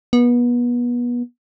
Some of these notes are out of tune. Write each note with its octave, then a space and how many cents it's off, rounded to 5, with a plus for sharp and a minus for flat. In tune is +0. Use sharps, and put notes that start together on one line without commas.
B3 -30